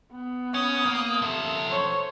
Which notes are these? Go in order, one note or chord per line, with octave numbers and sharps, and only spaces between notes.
B3
C#4 D#6
A#3
F3 A4 E5
C5 C#5